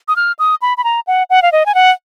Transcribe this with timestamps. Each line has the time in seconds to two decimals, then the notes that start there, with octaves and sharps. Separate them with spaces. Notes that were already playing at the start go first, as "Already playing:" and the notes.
0.08 D#6
0.16 F6
0.39 D#6
0.62 B5
0.77 B5
0.84 A#5
1.07 F#5
1.30 F#5
1.42 F5
1.52 D#5
1.66 G#5
1.75 F#5